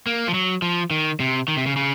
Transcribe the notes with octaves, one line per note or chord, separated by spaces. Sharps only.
A#3
F3
F#3
F3
D#3
C3
D#3
C3
C#3
C#3